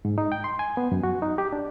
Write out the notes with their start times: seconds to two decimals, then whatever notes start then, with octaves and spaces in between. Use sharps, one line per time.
0.05 G#2
0.18 D#4
0.32 G5
0.44 C6
0.59 G#5
0.77 B3
0.92 F#2
1.03 F#4
1.22 D#4
1.38 G4
1.53 D4